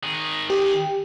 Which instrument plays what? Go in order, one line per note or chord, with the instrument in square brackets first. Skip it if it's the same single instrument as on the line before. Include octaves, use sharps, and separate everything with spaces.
[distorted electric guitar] D#3 G#4
[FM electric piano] G4